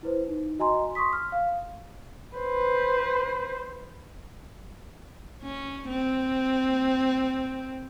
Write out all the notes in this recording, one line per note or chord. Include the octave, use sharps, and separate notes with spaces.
E4 B4 C5
D#4
F#4 D#5 G#5 A#5 C6
C6 C#6 D#6 B6
F6
F5
B4 C5
C#4
C4